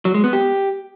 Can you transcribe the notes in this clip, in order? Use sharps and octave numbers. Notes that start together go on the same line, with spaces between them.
F#3
G#3
B3
G4